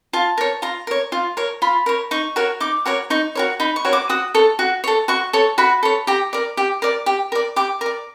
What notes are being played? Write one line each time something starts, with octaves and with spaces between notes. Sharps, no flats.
F4 A5
A#4 C#5
F4 A#5
A#4 C#5
F4
A#4 C#5
F4 B5
A#4 C#5
D#4 C#6
F#4 A#4 C#5
D#4 D6
F#4 A#4 C#5
D#4 C#6
F#4 A#4 C#5
D#4 B5
C#6
F#4 A#4 C#5
D6
F#4 D#6
A4 C#5
F#4
A4 C#5
F#4 C#6
A4 C#5
F#4 B5
A4 C#5
G4 A#5
A#4 D5
G4
A#4 D5
G4
A#4 D5
G4 D6
A#4 D5